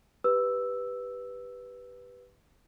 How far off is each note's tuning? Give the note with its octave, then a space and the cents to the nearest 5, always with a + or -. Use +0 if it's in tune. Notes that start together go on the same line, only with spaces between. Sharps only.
G4 +0 B4 +0 E6 +0